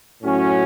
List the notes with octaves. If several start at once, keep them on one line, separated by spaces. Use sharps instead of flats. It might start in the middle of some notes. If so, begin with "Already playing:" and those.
A2 F#3 C#4 F#4